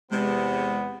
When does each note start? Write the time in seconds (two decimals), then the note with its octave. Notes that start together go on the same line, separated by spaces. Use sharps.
0.11 E2 C3 G#3 B3